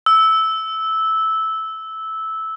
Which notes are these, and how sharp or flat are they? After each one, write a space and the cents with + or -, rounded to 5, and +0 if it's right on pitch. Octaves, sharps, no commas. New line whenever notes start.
E6 -10